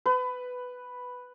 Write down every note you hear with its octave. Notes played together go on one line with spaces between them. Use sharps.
B4